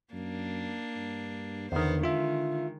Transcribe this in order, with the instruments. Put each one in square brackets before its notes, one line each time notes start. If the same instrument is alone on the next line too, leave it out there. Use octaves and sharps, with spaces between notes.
[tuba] F#2 [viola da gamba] A#3 D4
[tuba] G2
[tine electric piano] E2 D#3 [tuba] D3 [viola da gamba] B3 C5
[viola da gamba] D#3 G#3 [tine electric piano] F4 E5